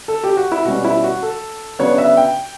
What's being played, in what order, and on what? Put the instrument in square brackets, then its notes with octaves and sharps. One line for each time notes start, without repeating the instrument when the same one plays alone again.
[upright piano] A4
G4
F#4
E4
B2 G3 C#4 F#4
E4
F#4
A4
C#3 F#3 B3 D4 C#5
E5
G5